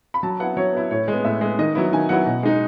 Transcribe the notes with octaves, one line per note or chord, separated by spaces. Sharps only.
B5
F#3 A5
B3 E4 F#5
F#3 C#5
B3 E4
A2 C#5
G#3
B3
A2 E5
G#3 B3
D#3 D#5
F#3 B3 E4
D#3 G#5
F#3 B3 E4 F#5
B2
G#3 D#4